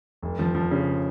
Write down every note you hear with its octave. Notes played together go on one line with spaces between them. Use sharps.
F1
F3
F3
C#3